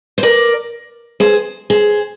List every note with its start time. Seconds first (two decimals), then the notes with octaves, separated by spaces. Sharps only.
0.18 C5
0.23 A#4 D5
1.20 G#4 C5
1.70 G#4 C5